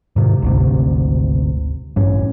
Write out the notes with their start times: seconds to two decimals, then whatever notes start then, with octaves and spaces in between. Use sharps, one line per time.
0.16 G#2 C3 D#3
0.42 G#1 D2 C3
1.96 A1 G2 C#4